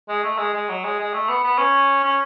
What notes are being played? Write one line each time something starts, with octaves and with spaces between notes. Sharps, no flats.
G#3
A3
G#3
G#3
F#3
G#3
G#3
A3
B3
B3
C#4
C#4